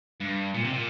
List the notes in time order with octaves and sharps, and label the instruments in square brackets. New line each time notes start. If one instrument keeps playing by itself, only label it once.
[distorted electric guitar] G2
A#2
C3
A#2